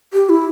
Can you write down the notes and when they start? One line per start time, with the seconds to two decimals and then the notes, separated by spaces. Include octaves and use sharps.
0.13 G4
0.29 E4